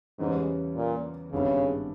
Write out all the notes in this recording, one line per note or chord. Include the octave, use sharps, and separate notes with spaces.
E2 G#2 C#3 E3 G3 C#4
A#2
G#1 G2 C#3 G3 B3 E4